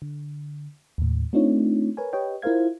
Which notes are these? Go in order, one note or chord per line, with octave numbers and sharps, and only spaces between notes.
D3
D#2 A2
A3 C4 D4 D#4 F4 C#5
A#4 B4 C#5 G#5
G4 B4 C#5 D#5 G5
E4 F4 A#4 C5 F5 G#6